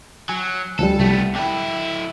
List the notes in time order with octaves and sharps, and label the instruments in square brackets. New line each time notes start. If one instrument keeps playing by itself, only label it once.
[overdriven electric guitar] F#3 [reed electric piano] G#5
[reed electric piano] D2 F3 G3 [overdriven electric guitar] A4
[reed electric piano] C2 G3 A5 [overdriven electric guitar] A3 B3
[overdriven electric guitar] D3 E4 [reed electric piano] G5